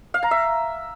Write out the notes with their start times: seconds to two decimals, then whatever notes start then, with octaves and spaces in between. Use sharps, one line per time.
0.14 F5
0.23 A#5
0.31 E5